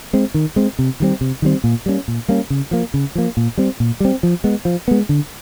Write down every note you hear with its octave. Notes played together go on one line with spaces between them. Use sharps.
G#3 C4
D#3
G#3 C4
C3
D#3 G3 C4
C3
D#3 G3 C4
A#2
G3 A#3 C#4
A#2
G3 A#3 C#4
C#3
F3 A#3
C#3
F3 A#3
A#2
G3 C4
A#2
G3 C4
F3
G#3 B3
F3
G#3 B3
D3